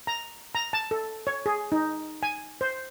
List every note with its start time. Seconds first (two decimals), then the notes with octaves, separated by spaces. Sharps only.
0.07 A#5
0.55 A#5
0.73 A5
0.91 A4
1.27 C#5
1.46 G#4
1.72 D#4
2.23 G#5
2.61 C5